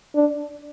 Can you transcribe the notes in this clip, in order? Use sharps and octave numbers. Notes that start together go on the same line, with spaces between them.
D4